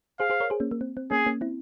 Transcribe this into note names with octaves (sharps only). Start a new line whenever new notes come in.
G#4 C5 F5
G#4 C5
A#4 C#5
G#4 C5
A#3 C#4
A#3
C4
C4
A#3 C#4 G#4
A#3 C#4
C4 E4